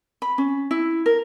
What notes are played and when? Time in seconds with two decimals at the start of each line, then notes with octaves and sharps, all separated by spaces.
0.22 B5
0.38 C#4
0.71 E4
1.06 A#4